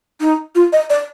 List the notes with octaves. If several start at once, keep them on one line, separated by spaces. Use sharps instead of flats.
D#4
F4
D#5
D5